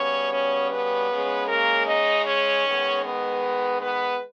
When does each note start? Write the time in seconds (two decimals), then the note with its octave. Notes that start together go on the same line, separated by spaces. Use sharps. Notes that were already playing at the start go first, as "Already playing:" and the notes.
Already playing: C#3 G3 B3 C#4 C#5
0.32 C#4 C#5
0.71 B3 B4
1.10 C#3 G#3 C#4
1.48 A#3 A#4
1.87 D#4 D#5
2.26 C#4 C#5
2.64 D#3 G#3 B3
3.03 B3 B4
3.81 B3 B4